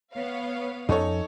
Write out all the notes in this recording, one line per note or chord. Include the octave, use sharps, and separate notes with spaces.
B3 C#5 F5
F2 C#4 D#4 A4 C#5